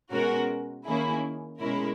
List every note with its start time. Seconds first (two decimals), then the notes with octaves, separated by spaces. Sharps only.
0.11 B2 G#3 C#4 F#4 A#4
0.86 D#3 A#3 C#4 E4 G#4
1.59 B2 G#3 C#4 E4 A#4